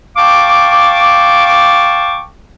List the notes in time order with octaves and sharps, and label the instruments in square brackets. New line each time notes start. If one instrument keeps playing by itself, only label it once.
[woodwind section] F5 G5 A5 C#6 D6